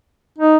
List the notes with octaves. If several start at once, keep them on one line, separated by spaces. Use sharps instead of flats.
D#4